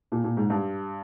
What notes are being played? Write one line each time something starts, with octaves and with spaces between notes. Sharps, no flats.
A#2
A#2
G#2
G2